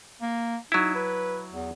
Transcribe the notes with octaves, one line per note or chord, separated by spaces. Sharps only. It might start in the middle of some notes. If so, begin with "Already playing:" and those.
A#3
F#3 D#4 E4
B4
E2